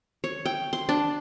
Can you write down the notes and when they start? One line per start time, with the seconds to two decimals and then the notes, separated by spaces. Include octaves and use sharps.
0.24 C#5
0.45 G5
0.73 C6
0.89 D4